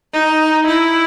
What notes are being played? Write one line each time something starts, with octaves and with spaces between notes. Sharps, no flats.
D#4
E4